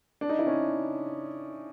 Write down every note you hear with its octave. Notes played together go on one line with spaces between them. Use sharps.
D4
D#4
E4
C#4